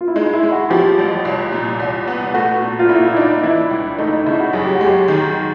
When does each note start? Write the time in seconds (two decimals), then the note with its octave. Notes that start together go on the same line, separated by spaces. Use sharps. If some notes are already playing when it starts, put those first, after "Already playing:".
0.01 F4
0.08 E4
0.15 G#3 D#4
0.34 E4
0.43 G#3
0.52 F#4
0.70 F3 G4
0.98 A1
1.25 C2
1.52 A#2
1.80 C2
2.08 B3
2.34 A3 F#4
2.62 A#2
2.79 F4
2.89 A#2 E4
3.08 E4
3.16 D4 D#4
3.43 E3 E4
3.71 C#2
3.98 A3 D#4
4.12 D#4
4.26 C#3 E4
4.40 F#4
4.53 F#2 G#4
4.64 G4
4.75 F#4
4.81 G#3 G4
5.08 D#3